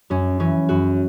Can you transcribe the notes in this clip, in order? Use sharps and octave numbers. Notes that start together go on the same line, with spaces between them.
F#2 C#4
E3 C#4
F#2 F#4